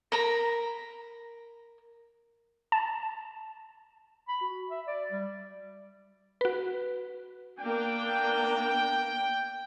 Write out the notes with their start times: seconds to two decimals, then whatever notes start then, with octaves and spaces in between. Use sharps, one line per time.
0.12 A#4 A#5 B5
2.72 A5
4.28 B5
4.42 F#4
4.70 E5
4.87 D5
5.11 G3
6.41 F#4 B4
7.59 A#3 B3 D4 G5